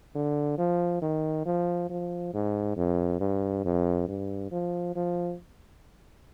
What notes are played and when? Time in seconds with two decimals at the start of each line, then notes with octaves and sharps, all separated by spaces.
0.15 D3
0.58 F3
1.02 D#3
1.46 F3
1.90 F3
2.34 G#2
2.77 F2
3.20 G2
3.65 F2
4.08 G2
4.51 F3
4.96 F3